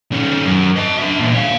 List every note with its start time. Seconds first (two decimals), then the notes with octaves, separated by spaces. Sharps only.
0.12 D#3 C#4
0.45 F#2
0.77 D#5 A5
0.98 D4 E5
1.19 E2 A#2
1.34 C#5 F5